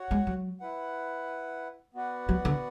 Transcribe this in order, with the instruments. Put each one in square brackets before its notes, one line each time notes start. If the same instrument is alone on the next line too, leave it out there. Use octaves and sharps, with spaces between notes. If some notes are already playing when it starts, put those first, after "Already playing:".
Already playing: [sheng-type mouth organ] F#4 C#5 F#5
[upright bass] G#3
F#3
[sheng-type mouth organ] E4 B4 F#5
B3 F#4 B4 D5 F#5
[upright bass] F#3
D3